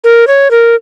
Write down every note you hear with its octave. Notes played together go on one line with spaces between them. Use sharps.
A#4
C#5
A#4